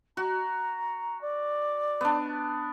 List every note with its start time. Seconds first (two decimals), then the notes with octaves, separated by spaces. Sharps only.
0.17 F#4 A#5
1.21 D5
2.01 B3 D4